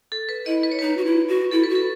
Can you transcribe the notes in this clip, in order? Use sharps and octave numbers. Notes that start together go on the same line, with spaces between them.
A4
B4
E4 D#5
B4
C#5
D#4 B4
F#4
E4
F#4
E4 A4
B4
F#4
A4